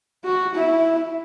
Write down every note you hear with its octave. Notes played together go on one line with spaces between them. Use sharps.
F#4
E4